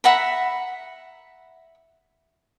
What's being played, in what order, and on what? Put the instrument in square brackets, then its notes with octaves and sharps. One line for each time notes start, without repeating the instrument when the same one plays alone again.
[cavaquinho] E5 F#5 A#5 B5